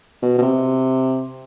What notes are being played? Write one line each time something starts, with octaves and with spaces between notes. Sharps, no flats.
B2
B2
C3